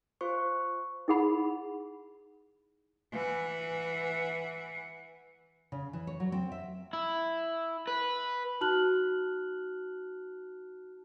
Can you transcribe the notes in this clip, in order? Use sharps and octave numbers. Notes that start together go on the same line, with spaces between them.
F4 C5 C#6
D#4 E4 G#4 F#5 B5
E3 F#5
C#3
E3
C#5
F#3
C4
E5
E4
B4
D#4 F#4 A5 F6 F#6 F#7